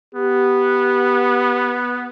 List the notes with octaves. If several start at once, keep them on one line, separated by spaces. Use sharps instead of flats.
B3 G4